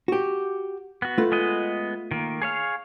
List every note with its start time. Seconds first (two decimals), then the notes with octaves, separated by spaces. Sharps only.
0.08 F#4 G4
1.02 B3 F#4
1.18 A3 F4 B4
1.32 G#3 B3 D#5
2.11 D#3 A#3
2.42 G#4 C#5 F5